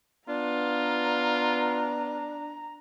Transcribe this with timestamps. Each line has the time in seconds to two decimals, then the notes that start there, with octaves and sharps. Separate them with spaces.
0.29 B3 D4 F4 A#5